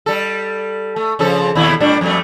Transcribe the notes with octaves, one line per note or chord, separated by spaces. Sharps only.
G3 A4
A3
C#3 F3 A4
D#2 B2 E4
A2 G3 D4
F2 G3 A3